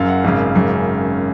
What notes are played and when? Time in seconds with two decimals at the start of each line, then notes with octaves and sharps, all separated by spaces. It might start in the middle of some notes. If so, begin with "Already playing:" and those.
Already playing: F#1 F#2 F5
0.08 F#5
0.24 G#1 F#2 C#3 F5
0.54 G#1 F#2 C#3